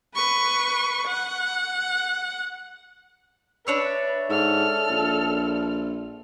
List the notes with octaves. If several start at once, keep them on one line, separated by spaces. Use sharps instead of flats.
B4 C#6
F#5
D4 B4 C#5 E5
G#2 A4 F6
A#1